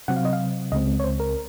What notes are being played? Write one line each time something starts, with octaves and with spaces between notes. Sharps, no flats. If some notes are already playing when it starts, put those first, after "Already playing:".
C3 F#3 C4 F#5
F5
D#5
F5
C#2 C#3 G#3 C4 D#5
C#5
C5
A#4